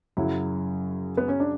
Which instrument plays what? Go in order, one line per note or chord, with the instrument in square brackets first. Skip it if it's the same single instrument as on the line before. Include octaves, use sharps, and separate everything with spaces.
[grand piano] F#2 C#3 F#3 [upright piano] E4
[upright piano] B3
C#4
D4